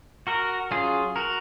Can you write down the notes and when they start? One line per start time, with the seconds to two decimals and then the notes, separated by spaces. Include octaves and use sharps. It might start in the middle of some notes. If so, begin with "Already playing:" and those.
0.27 F#4 A#4
0.71 F#3 C#4 F4 G#4
1.16 F#4 A#4